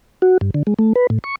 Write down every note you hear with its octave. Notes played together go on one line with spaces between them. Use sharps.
F#4
G2
D3
G#3
A3
B4
A2
C#6